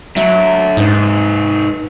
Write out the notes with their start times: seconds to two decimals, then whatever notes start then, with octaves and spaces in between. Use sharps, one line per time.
0.16 F#3 D4 E5
0.77 G#2 D#4 B4